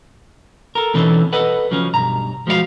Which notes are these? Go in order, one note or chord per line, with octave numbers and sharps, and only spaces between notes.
A4 A#4
B2 E3 C4 C#4 D#4 A4
A4 B4 D#5 F#5
C#3 F3 F#3 C#4
B1 G2 A#5
F3 G#3 F#4 C5 F5